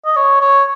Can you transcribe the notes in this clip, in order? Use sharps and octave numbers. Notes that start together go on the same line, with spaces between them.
D#5
C#5
C#5